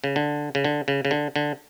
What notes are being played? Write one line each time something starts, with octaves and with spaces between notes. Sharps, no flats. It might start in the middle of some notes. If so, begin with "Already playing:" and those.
C#3
D3
C#3
D3
C#3
C#3
D3
D3